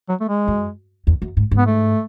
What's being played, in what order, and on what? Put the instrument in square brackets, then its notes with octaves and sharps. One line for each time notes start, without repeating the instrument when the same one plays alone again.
[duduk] F#3
A3
G#3
[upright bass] F#2
E2
F#2
G#2
G#2
[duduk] B3
A3